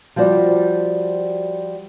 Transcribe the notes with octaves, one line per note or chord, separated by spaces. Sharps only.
F3 G3 F#4 C5 D5